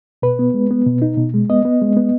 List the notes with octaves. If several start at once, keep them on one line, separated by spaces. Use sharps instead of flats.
B2 B4
B3
G#3
B3
B2
D#4
B2
G#3
B3 D#5
B3
G#3
B3